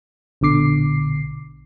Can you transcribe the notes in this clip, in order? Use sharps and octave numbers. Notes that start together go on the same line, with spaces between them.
A#1 B2 D3 D6 C7